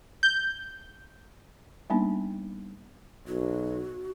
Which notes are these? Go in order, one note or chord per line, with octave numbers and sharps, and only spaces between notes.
G6
G3 A#3 B3 D4 D#4
B1 F#4